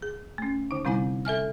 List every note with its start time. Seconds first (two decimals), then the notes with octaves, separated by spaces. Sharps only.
0.02 G#4
0.38 A3 C#4
0.71 D3 D#4
0.85 C3 G3 C4 E4 G#5
1.25 A4 E5 G#5 F6